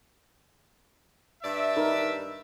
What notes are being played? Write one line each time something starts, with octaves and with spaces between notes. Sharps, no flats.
G2 D5 E5
D#4 A#4 B4